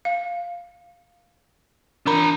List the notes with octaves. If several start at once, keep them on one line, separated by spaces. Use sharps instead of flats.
F5
E3 D4 A#4 A#5 B5